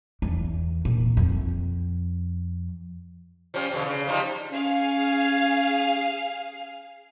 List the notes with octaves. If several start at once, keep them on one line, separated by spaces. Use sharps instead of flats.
E2
A#2
F2
F3 G3 C#4
E2 B2 D3
C#3
F3 G3 D#4
C#4 G#4 F5